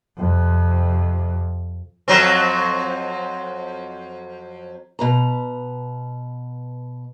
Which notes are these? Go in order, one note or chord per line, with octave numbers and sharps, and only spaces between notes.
F2 C3
F2 F#3 C4
B2 B4 A#5